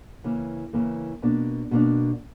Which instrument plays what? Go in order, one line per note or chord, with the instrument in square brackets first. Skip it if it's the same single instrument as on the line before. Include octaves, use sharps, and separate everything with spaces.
[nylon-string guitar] C#3 E3 A#3
C#3 E3 A#3
B2 A#3 D4
B2 A#3 D4